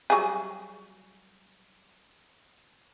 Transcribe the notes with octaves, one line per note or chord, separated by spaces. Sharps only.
F#3 G3 G#4